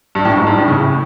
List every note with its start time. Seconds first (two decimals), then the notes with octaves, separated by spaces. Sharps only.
0.15 G2
0.25 A2
0.37 G#2
0.47 G2
0.58 A2
0.68 C#3
0.80 A2